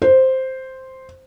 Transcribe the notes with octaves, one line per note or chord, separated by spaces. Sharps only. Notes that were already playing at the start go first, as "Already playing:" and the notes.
C5